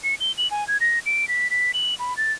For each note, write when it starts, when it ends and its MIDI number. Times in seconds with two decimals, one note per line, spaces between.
0.04 0.15 97
0.20 0.32 103
0.38 0.50 102
0.51 0.67 80
0.68 0.77 92
0.81 0.99 94
1.06 1.27 98
1.28 1.50 95
1.50 1.72 95
1.74 1.94 102
1.99 2.16 83
2.17 2.32 93